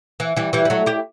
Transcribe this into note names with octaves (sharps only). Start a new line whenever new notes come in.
E3
E3 G3
E3 G3
G3
F#3 A3
E4 G4